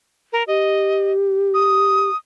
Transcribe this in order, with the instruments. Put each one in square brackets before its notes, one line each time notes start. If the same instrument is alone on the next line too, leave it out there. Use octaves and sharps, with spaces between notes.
[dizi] A#4
[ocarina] G4 [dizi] D#5
[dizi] D#6